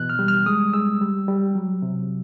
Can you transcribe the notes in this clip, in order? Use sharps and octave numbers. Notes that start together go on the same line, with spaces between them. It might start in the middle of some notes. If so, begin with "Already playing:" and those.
Already playing: B2 E3 F#6
F6
G3
F6
G#3 D#6
G#3 E6
G3
G3
F#3
C3